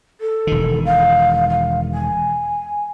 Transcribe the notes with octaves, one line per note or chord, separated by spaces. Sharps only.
A4
E1 D#3
F5
F5
G#5